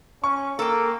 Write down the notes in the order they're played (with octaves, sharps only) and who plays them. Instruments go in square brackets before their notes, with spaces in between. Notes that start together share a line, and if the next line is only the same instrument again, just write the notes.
[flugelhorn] C#4 [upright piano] C#6
[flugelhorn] A#3 [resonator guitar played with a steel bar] A4 G5